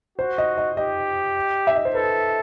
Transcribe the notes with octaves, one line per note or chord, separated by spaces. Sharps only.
F#4 C5
D#5
D#5
G4 D#5
E5
D#5
C5
A4 B4